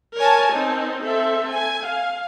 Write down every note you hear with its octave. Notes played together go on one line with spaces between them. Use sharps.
A#4 C#5 G#5 A5
C4 D#4
C4 A4 E5
G#5
F5